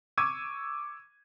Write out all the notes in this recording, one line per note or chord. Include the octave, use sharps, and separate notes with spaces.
C#6 D6 E6 G#6 D#7